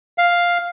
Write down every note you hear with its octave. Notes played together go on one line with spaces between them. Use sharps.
F5